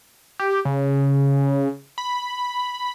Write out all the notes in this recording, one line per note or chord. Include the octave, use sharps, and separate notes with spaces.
G4
C#3
B5